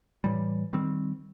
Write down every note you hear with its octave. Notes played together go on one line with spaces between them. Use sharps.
A2 E3 G3
D#3 G3 C4